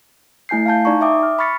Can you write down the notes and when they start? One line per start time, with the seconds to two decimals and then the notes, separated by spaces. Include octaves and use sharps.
0.49 A3 E4 G#5 G6 C7
0.66 F5 G#5 A5 G6
0.85 D#4 D5 A#5 C#6
1.01 E5 G5 D6 D#6
1.23 F6
1.39 B5 C#6 F6 A6 B6 C#7